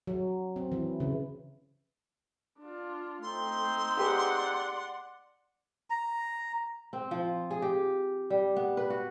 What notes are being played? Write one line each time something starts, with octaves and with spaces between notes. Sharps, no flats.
F#3
C4
E3
C#3
D4 F4
A3 C4 D#4 C6
G4 G#4 B4 D5 F#5
A#5
C4
F3
G#4
G4
G3
B3
B4
F#4